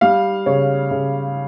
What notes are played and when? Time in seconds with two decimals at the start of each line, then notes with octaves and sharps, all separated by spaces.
0.01 G3 F5
0.46 C#3 C#5
0.91 C#3